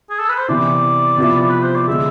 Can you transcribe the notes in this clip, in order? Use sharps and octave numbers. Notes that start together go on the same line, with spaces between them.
G#4
A4
B4
C5
C3 E3 B3 E4 D5
C3 F3 B3 E4
B4
C5
D5
D3 G#3 B3 E5